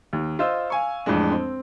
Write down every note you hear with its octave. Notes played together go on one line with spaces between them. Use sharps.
D#2
F4 C5 D#5 E6
F5 G#5 C#6
F2 A2 E3 G#3 D4
C4